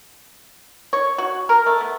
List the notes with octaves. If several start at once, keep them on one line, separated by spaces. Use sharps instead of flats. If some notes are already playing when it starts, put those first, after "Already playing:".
C#5
F#4
A#4
A3
B3